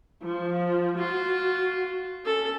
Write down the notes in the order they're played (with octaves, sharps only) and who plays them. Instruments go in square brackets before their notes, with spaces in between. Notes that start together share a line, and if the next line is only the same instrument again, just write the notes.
[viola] F3
[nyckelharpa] F4 [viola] F#4
[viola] C#4 [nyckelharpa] A4